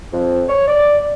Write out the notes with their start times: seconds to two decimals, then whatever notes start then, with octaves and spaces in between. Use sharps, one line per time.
0.13 F2
0.49 C#5
0.67 D5